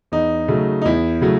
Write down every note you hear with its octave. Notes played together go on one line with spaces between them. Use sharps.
E2 D#4
C#3 F#3 A3
D#4
E2 E4
C#3 F#3 A3